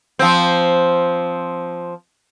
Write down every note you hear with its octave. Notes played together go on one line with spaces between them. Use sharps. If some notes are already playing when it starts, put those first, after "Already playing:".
F3 C4